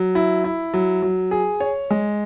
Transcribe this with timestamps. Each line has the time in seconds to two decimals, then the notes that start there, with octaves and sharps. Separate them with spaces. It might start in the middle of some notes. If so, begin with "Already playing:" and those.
Already playing: F#3
0.15 E4
0.44 E4
0.74 F#3
1.02 F#3
1.31 G#4
1.60 C#5
1.90 G#3